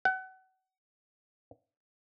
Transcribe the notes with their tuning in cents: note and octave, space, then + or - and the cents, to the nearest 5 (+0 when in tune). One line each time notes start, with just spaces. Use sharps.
F#5 +30